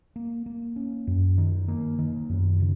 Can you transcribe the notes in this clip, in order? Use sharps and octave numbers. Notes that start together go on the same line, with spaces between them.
A#3
A#3
C#4
F#2
D#3
A#3
D#3
F#2
C#3